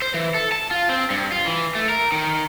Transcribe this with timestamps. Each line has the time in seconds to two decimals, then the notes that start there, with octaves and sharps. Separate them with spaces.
0.02 C5
0.14 E3
0.35 A4
0.52 A5
0.71 F4
0.89 C4
1.10 G2
1.32 F4
1.46 E3
1.75 A3
1.89 A#4
2.12 D#3